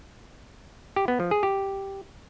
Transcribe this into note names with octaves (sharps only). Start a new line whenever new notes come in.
G4
B3
F3
G#4
G4